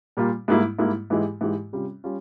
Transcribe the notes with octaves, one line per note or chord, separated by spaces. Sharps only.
A#2 G3 A#3 F4
G#2 G3 A#3 E4
G#2 G3 A#3 E4
G#2 E3 G#3 E4 G4
G#2 E3 G#3 E4 G4
C3 G3 C#4 F4
G3 C#4 F4